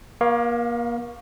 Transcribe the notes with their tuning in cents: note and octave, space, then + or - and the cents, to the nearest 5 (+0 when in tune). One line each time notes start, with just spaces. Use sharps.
A#3 +35 F5 +0 C#6 +0